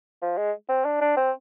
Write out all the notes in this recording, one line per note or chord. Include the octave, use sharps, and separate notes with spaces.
F3
G#3
C4
D4
D4
C4